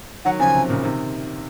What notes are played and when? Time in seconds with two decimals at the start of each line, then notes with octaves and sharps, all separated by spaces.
0.25 D#3 F#3 F#5
0.39 C#3 F3 G#5
0.54 C3
0.70 A#2 C#3
0.84 C3 D#3